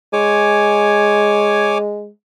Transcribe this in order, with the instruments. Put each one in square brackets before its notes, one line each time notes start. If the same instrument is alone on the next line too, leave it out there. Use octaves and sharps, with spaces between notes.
[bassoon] G#3 [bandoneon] C#5 G#5 D6